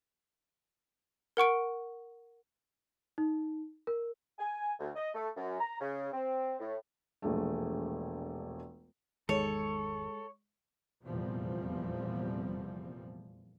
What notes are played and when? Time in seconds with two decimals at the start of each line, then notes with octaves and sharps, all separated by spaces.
1.37 A#4 F#5 C#6 D7
3.18 D#4
3.87 A#4
4.39 G#5
4.79 D2
4.95 D#5
5.14 A3
5.36 F#2
5.59 A#5
5.80 C#3
6.12 C4
6.59 A2
7.22 E1 A#1 G#3 A3
9.29 G#1 E2 D#3 G#3 A4 C#5
11.04 F1 E2 A#2 F3 G3 C4